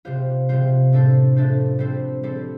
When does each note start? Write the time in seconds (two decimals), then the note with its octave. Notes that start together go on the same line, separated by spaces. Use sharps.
0.05 C3 G3 F4 C5
0.49 C3 G3 F4 C5
0.92 A2 A3 D4 A4 C5
1.36 A2 A3 D4 A4 C5
1.79 G3 C4 A4 C5
2.23 G3 C4 A4 C5